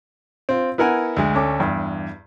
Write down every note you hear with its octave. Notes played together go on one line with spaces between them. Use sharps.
C4 F4
B3 E4 A#4 F#5 G#5
D2 G#3
D2 C#4 A4 D6
E2 G2